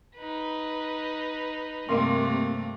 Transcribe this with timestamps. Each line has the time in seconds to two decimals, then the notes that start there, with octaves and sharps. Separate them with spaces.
0.16 D#4 B4
1.89 G2 C3 A3 A#3 C4 C6